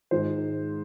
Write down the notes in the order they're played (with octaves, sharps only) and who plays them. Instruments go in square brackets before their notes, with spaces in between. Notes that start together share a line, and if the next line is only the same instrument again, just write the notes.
[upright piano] G#2 D#3 G#3 C5